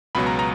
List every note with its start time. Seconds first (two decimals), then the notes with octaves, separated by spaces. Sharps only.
0.15 C#2 B2 F#3 B3 B5
0.27 A#5
0.39 A#5